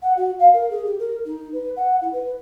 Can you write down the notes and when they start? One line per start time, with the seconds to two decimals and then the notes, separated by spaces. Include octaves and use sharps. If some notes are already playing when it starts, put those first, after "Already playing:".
0.02 F#5
0.17 F#4
0.39 F5
0.53 A#4
0.70 G#4
0.85 G4
0.99 A#4
1.25 D#4
1.53 B4
1.76 F#5
2.01 E4
2.13 B4